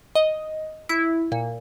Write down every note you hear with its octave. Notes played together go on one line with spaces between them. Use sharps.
D#5
E4
A#2